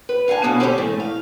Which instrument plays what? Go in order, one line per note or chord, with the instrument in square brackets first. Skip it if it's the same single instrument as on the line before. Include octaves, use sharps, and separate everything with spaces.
[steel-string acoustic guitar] B4
D3 F5 F#5 G#5 A5
B2 D3 B3 C#4 E4 F5
C4 C#4 G4 A4 A#4 C5
A2 E3 G#3 A3
F5